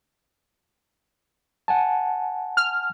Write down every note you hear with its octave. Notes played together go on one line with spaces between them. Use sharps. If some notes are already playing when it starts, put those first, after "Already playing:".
F#5 G#5 A5
F6